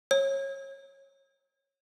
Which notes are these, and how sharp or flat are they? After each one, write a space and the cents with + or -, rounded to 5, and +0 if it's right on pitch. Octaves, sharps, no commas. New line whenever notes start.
C#5 -25